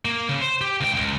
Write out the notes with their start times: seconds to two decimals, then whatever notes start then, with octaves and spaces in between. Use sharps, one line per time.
0.05 A#3
0.29 C#3
0.41 C5
0.61 G4
0.81 C#2 G5
0.97 C#2